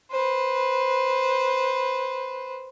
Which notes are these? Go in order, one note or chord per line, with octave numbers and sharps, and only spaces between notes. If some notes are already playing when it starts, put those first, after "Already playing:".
B4 C5